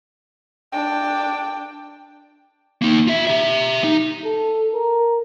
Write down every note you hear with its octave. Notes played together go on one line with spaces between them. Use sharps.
D4 G5
A#3 D#4
F4 E5
G4 E5
D#4
A4
A#4